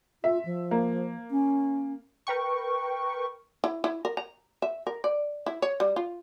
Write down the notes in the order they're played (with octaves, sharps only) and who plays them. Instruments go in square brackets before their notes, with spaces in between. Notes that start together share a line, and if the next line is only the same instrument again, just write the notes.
[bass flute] F4 [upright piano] E5
[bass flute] F3
[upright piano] A#3
[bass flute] C#4
[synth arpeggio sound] A#4 B4 G5 C#6
[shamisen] E4
E4
A#4
A#5
E5
A#4
D5
E4
C#5
G3
F4